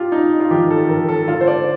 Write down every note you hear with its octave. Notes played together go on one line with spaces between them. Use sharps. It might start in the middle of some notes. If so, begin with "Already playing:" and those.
Already playing: D4 F4 G4
D4 D#4
F4
D#3 G4
A4
D#3 A#4
A4
D3 F4
C5
D5